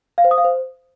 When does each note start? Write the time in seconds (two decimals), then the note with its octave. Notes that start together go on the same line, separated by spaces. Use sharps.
0.18 F5
0.24 C5
0.31 D#6
0.38 F5
0.44 C5